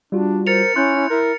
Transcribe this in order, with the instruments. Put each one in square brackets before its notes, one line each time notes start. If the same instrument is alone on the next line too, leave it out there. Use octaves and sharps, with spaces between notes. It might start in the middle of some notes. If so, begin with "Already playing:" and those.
[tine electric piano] G3 F4 F#4 [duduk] D4
[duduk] A#4 [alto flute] C5 [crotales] A6 C#7 F7
[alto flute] C#4 [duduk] E4 [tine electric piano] C6 F#6 G6
[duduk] E4
[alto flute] E4 [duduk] A#4